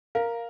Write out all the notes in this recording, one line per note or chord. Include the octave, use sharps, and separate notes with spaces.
A#4 F5